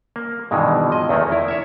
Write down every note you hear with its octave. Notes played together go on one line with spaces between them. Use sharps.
A#3
G2 B2 D#3 E3 G#3
F3 D#5
E2 D#3 A3 A#3
E4 A#4
C#5 E5